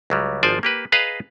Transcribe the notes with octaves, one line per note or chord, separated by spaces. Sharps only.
C#2 F#3 G3
G#1 F3 C5 D5 G#5
A#3 G4 B4
G#4 B4 D#5 F5 A#5